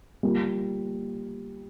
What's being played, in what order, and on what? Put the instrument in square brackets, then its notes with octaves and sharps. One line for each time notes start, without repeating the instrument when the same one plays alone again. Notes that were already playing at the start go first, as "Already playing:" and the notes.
[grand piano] G3 A#3 F4